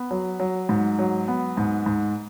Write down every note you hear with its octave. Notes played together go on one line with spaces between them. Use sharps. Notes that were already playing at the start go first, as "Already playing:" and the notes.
Already playing: B3
F#3
F#3
G#2
F#3
B3
G#2
G#2